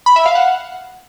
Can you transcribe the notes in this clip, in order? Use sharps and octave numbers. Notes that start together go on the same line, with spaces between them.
B5
E5
F5
F#5